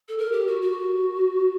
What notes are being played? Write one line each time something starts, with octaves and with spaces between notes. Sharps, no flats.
A4
A#4
G4
F#4
F#4